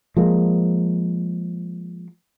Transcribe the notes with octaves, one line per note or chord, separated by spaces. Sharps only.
F3 G#3 A#3